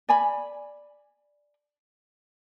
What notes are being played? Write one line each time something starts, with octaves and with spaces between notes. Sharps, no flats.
D5 G#5 B5